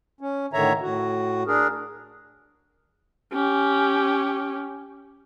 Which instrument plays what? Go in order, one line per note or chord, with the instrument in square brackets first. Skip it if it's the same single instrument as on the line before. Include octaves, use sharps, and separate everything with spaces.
[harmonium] C#4
A2 D3 D#3 C#5 E5 A#5
A2 F#4
D4 G#4 A#4
[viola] C#4 G4